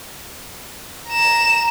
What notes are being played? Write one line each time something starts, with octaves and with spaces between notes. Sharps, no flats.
A#5 E7